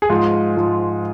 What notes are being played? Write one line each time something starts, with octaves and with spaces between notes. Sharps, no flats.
G#4
G#2 F3 G#3 F4
G#2 F3 G#3